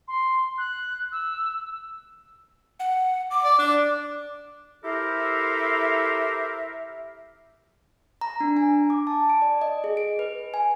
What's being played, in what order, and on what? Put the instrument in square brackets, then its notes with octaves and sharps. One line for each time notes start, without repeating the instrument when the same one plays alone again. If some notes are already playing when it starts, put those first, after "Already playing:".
[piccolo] C6
F#6
E6
[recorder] F#5
D6
[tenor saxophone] D5
D4
[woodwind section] E4 G4 A4 A#4 C5 E5
[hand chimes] A#5
D4
G#5
D6
A5
D7
D5
D#5
G#4
D7
B4
G#5